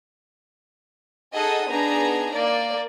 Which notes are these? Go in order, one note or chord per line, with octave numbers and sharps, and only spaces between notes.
D#4 G#4 A4 D#5 F#5 D#6
B3 D4 D#4 G#4 A#5
A#3 D5